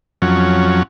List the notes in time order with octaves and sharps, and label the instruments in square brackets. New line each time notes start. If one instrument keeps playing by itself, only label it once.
[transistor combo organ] F2 F#3 C#4